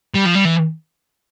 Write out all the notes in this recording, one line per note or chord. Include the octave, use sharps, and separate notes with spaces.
G3
F3
G3
E3